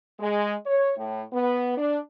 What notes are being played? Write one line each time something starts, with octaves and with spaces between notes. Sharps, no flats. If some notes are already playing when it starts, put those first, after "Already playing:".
G#3
C#5
A2
B3
D4